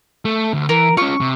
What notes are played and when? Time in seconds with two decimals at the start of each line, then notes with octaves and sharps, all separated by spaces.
0.25 A3
0.53 D2
0.69 E3 A#4
0.97 C#4 F4 C#6
1.20 C3